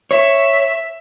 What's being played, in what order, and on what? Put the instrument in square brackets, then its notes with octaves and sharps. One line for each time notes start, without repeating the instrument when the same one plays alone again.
[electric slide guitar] C#5 [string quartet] E5